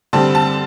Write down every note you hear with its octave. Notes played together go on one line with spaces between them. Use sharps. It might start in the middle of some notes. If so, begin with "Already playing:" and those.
D3 G3 C4 A5
A5